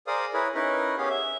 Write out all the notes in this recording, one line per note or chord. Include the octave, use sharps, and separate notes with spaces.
G#4 A#4 C5 D5 F5 D#6
E4 G#4 A#4 B4 C#5
C#4 D#4 E4 A#4 B4
B3 C#4 G4 G#4 C#5 F5
E5